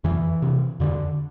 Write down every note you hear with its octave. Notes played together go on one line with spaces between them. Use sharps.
F2 E3
C3
F2 D3